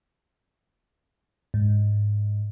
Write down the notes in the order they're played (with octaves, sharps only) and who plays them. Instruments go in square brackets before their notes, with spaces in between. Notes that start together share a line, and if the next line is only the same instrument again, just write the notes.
[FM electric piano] G#2